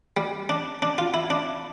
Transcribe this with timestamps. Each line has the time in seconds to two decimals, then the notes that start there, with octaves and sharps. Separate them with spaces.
0.17 G3
0.49 D4
0.82 D4
0.98 F4
1.14 E4
1.30 D4